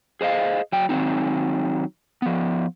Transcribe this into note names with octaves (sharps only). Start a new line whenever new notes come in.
G#4 C5 D#5 F5
F#3 G5
D#3 F#3 C4 D#4
F3 B3